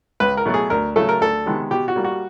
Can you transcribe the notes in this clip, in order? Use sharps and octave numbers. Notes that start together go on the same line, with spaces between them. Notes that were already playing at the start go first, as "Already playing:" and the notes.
C#2 B4
A#4
B2 F#3 A3
G#4
D2 A#4
C#3 F#3 A3 A4
A#4
D2 A4
C3 D#3 G#3 B3
B2 G4
F#4
G3 A#3
F#4